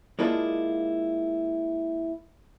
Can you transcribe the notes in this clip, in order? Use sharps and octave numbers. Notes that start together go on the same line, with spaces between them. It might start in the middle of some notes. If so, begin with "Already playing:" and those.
G#3 A#3 D4 E4 F4 A4